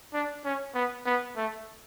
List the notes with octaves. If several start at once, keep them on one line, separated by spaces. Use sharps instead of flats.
D4
C#4
B3
B3
A3